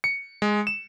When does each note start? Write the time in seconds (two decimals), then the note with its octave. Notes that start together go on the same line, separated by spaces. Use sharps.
0.04 C#7
0.42 G#3
0.67 E7